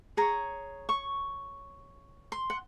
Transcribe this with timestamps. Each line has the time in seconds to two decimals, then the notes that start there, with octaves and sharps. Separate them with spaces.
0.17 G#4 C#5 A#5
0.89 C#6
2.32 C6
2.50 F#5